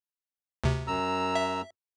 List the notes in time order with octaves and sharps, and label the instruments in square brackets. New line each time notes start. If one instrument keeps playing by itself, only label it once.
[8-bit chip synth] D2 C3
[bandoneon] F#2 A#5 E6
[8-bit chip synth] E5